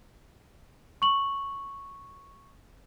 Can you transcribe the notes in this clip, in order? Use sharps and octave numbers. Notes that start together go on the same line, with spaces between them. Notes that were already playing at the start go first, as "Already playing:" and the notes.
C#6 F#7